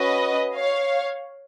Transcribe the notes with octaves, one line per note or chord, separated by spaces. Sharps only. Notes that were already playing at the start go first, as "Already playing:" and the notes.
Already playing: C#4 F#4 B4 D#5
C#5 F5